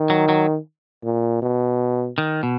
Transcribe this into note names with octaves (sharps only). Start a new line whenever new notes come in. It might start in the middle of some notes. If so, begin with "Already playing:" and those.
Already playing: D#3
F#3
F#3
A#2
B2
D#3
B2